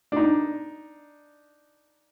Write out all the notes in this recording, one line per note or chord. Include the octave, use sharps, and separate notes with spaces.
D4 D#4